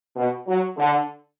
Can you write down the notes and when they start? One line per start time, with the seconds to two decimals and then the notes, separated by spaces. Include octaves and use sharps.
0.16 B2
0.47 F#3
0.77 D3